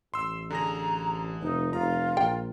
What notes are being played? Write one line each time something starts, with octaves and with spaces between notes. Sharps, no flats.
A1 C6 E6
D3 G#4 A#5 A#6
F1 D#4
F1 F4 A#5
A#1 G5